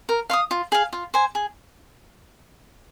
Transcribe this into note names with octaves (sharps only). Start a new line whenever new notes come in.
A#4
F5 C6 D#6
F4
G#4 F5
F4
C5 G#5
G#4